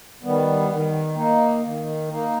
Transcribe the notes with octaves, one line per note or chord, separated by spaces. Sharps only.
D#3 G3 B3
D#3
A#3 D#4
D#3
A#3 D#4